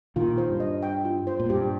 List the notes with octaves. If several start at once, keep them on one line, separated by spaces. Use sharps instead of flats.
A#2 D#3 F4
C5
G2
D#5
G5
F4
C5
A#2
G2 G4